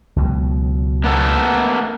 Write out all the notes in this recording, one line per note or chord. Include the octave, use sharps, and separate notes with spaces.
C#2 B2 F#3
A#3 B3 A4